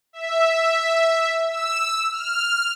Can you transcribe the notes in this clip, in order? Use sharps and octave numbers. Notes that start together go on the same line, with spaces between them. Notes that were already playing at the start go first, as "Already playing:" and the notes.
E5
E6
F6